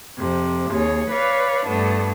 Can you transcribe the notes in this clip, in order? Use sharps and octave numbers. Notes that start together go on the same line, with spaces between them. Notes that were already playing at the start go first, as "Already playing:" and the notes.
F2 C3
D#2 G#4 C#5
B4 C#5 D5 F5
G2 A3 B3 D4